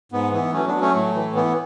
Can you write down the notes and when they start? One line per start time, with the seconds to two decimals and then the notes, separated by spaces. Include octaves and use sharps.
0.12 G#2 B3
0.32 E3 B3
0.53 F#3 A3 C#4
0.67 B3 D4
0.74 F#3
0.80 A3 C#4
0.95 A2 A3
1.15 E3
1.35 E3 B3